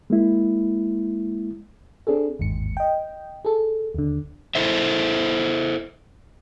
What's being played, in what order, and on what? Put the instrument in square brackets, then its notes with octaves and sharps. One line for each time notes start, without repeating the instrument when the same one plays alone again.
[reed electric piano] G#3 A#3 E4
[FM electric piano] C4 D4 G#4 A4
G1 D#2 G#2 C#7
D#5 G5
G#4 A4
D#2 D3
[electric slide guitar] E4 A4 C5 E5